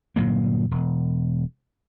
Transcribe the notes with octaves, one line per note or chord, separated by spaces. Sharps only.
G1 A#2 F#3 A#3
E1